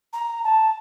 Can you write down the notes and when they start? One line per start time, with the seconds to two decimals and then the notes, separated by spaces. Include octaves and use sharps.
0.13 A#5
0.44 A5